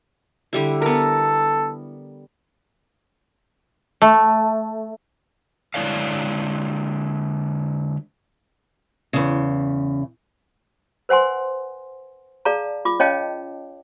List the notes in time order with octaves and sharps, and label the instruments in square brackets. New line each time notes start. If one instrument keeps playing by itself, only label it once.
[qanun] D3 G3 E4
[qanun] B3 A#4 [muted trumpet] A4
[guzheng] A3
[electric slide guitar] D3 G#3 E4 C#5 D5 F5
[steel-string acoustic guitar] E2 C#3
[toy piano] B4 C5 F#5 G#5 C6
G#4 D5 F5 A5 A#5
F4 D6
C#4 C#5 D#5 F5 G5 A5